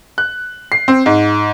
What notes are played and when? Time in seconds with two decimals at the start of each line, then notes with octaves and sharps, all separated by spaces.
0.18 F#6
0.72 C7
0.88 C4
1.06 G#2